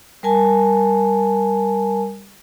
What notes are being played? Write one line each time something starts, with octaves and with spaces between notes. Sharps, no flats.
G3 A#4 G#5 A5